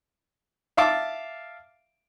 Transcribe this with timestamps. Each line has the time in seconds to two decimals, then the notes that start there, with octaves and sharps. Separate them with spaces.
0.77 E5 F5 A5 D6